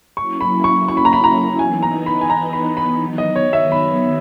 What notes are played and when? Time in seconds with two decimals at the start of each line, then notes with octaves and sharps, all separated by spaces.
0.17 F#3 A#3 C#4 E4 C#6
0.41 B5
0.64 C#6
0.88 C#6
0.97 B5
1.05 A#5
1.13 B5
1.24 A#5
1.59 E3 B3 D#4 G#5
1.83 A#5
2.06 B5
2.21 G#5
2.30 A#5
2.53 B5
2.77 B5
3.01 D#3 F#3 B3
3.18 D#5
3.36 C#5
3.53 E5
3.72 B5